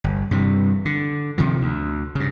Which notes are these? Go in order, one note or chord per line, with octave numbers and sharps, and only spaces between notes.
G1
G2 C3 E3
D3
C3 D#3 F3
D2
G2 C#3